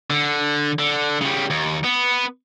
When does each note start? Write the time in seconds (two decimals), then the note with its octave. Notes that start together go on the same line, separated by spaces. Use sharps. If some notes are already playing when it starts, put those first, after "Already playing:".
0.10 D3
0.79 D3
1.21 C#3 G3
1.50 D#2
1.84 B3